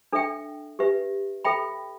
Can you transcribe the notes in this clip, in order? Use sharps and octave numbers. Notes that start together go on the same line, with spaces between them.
D4 A4 E5 G5
G4 B4 E5
A4 E5 G5 B5